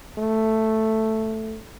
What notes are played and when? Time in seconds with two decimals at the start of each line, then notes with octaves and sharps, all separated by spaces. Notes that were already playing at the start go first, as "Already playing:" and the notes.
0.18 A3